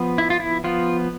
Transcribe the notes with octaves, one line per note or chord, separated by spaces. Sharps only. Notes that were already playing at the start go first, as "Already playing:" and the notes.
Already playing: F3 B3
E4
F4
E4
F3 B3 F4